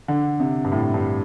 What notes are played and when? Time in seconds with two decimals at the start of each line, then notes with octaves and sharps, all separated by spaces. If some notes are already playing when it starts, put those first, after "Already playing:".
0.08 D3
0.40 C3
0.64 G2
0.72 A2
0.94 G2